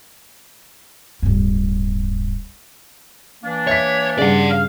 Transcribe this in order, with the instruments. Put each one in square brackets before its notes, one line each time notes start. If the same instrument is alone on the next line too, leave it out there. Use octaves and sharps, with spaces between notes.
[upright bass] D1 G2
[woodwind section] E3 A#3 D4
[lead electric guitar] C#5 [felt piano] E5 B6
[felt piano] G2 C#3 [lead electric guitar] D5 F#5
[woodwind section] F5